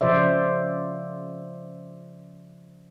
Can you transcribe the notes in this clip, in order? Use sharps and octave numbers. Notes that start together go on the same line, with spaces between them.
C#3 F3 C5 D5 E5